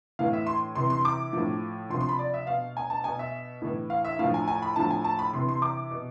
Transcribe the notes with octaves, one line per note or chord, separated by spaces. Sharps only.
A2 E3 F5
E5
C6
C3 E3 C6
C6
D6
A2 F3
C3 F3 C6
C6
B5
D5
E5
B2 F5
G#5
A5
B2 G#5
E5
A2 E3
F5
E5
A2 F5
F3
G#5
G#5
B5
A2 F3 A5
G#5
A5
B5
C3 E3 C6
C6
D6
B2